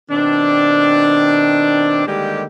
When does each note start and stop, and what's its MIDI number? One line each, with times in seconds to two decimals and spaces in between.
0.11 2.03 47
0.11 2.03 51
0.11 2.03 60
0.11 2.03 62
2.07 2.44 50
2.07 2.44 51
2.07 2.44 55
2.07 2.44 56
2.07 2.44 58
2.07 2.44 67